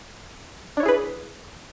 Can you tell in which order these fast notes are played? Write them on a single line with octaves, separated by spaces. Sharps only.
D4 C#5 E4 G#4 B4